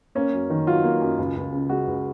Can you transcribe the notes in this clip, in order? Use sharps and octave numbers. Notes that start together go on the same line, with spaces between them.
A#3 C#4
F#2
D#3
F#3 F4
A#3
F#2
C#2
C#2
C#3
G#3 F#4
C#2